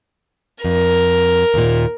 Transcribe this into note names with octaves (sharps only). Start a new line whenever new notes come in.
F2 A#4
D#2 A#2